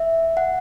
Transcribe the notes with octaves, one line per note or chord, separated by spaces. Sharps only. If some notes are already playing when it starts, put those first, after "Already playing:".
Already playing: E5
F#5